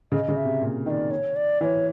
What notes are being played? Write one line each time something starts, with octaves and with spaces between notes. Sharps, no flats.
C#3 D#5
C#3
E5
C3
A#2
D#3 D5 D#5
C#5
D5
E3 C#5 D5